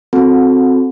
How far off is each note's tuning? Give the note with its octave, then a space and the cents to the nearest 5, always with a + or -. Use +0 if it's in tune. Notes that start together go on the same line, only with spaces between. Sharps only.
C4 +0 F#4 -30 A4 -15